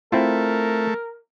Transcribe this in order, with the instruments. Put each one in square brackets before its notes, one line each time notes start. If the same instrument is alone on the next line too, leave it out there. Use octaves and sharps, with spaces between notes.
[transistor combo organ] A3 [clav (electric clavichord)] C4 E4 F4 [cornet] A#4